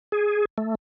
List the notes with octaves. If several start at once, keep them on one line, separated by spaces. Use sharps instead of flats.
G#4
A3